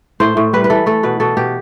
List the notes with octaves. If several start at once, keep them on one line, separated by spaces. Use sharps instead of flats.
A2 C5
A2
G3 B4
B4
E3 A4
A3 A4
B2 B4
B2 A4
B2 G4